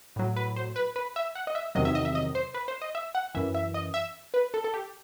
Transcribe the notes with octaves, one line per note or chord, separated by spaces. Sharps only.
A2 F#3
B4
C5
B4
B4
E5
F#5
D#5
E5
E2 C3 D#3 F#3 D#5
E5
D#5
E5
D#5
C5
B4
C5
D#5
E5
F#5
F#2 E3 E5
E5
D#5
E5
B4
A4
A4
G4